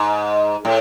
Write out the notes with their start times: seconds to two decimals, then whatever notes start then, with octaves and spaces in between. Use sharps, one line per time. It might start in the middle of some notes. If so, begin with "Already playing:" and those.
Already playing: G#2
0.65 A2